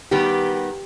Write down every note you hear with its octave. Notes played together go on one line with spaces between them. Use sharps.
D#3 G3 B3 G4